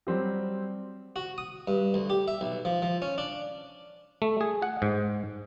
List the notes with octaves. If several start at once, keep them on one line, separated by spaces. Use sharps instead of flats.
F#3 G3 C4 G4
F#4
D#6
G2
D2
G4
E5
B1
F3
F3
C#4
D4
A3
G#4
F#5
G#2